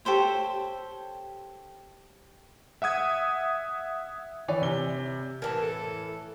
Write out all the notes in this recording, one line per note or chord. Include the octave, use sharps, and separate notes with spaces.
G4 A4 C5 C#5
E5 F#5 D#6 G#6
E3 C#5 D5 G#5
C3 G7
A2 E3 A#4 A5
A4